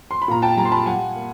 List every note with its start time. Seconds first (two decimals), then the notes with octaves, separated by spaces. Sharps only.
0.11 C6
0.22 B5
0.28 A#2 A#5
0.42 G5 A5
0.57 G3 G#5 A#5
0.65 C6
0.72 A5 B5
0.86 G3 F#5 G#5
1.16 A#3